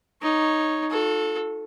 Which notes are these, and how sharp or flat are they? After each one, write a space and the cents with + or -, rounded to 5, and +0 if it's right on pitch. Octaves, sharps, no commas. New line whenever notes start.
D#4 +0 C#5 +0
F#4 -45 A4 +0